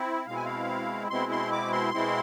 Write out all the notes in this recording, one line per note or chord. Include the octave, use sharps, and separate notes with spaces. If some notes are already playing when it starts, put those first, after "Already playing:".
Already playing: C4 E4
B2 G#3 C4 E4 F5
G#5
F5
B2 G#3 C4 E4 C6
C6
D6
C6
B2 G#3 C4 E4